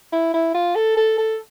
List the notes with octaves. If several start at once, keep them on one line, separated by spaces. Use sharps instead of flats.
E4
E4
F4
A4
A4
A4